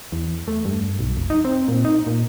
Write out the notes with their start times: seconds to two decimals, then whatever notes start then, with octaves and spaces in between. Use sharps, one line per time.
0.12 E2
0.48 A3
0.65 G2
0.99 B1
1.17 F1
1.30 D#4
1.45 C4
1.68 A#2
1.85 D#4
2.07 A#2